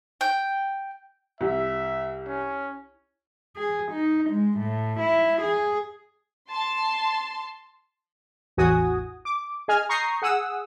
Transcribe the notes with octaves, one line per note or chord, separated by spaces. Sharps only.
G5
C2 E5
C#4
G#4
D#4
G#3
A2
E4
G#4
A5 C6
A1 E2 F#4 G#5 D#6
D6
G#4 D#5 G#5 F6
A#5 C#6 D#6 G6 A#6 C7
G#4 F#5 D#6 E6